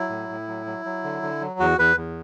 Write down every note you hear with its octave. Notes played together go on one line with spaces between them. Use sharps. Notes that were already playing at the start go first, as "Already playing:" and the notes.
Already playing: F#3 E4
A2
A2
F#3
F#3
F#3
D3
D3
F#3
E2 F#4
E2 B4
E2